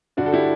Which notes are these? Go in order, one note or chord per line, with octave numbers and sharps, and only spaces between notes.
G2 D3 D4 F#4
A4
E4 G4